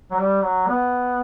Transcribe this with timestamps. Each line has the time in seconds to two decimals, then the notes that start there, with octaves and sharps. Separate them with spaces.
0.11 F#3
0.18 G3
0.43 F#3
0.68 B3